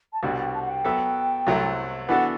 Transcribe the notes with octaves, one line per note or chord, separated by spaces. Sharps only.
A5
C2 B2 G3 D4 F#4 G5
G5
A5
F#5
G5
F#3 B3 F#4 A4 E5
C2 C3 F#3 A3 E4
E3 B3 D4 F#4 A4 F#5